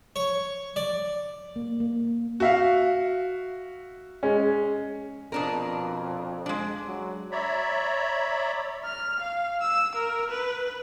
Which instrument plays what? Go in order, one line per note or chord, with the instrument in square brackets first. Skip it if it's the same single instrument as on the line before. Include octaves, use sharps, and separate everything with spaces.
[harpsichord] C#5
D5
[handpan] A#3
A#3
[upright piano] F#4 E5 F5
G#3 C#4
[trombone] F2 [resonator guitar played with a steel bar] B2 D4 A#4
[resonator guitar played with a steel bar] G#3 D4
[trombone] F#3
[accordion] C#5 D5 E5 A#5 B5
[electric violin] F6
F5
E6
A#4
B4